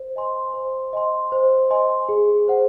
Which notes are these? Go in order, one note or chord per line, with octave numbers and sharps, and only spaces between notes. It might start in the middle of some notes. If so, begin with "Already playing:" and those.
Already playing: C5
D#5 G#5 C6
C5
D#5 G#5 C6
C5
D#5 G#5 C6
G#4
C5 F#5